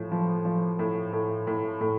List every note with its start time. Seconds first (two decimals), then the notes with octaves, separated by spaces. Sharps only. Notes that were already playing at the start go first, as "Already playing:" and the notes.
Already playing: A2 F3
0.12 F3
0.45 F3
0.79 A2
1.13 A2
1.47 A2
1.81 A2